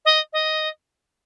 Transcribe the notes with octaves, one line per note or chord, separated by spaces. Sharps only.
D#5
D#5